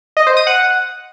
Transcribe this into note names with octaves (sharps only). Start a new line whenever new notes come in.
D#5
C5
D#6
F#5